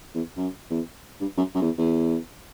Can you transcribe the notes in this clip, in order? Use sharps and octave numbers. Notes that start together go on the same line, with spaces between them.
E2
F#2
E2
G2
F#2
F#2
E2
E2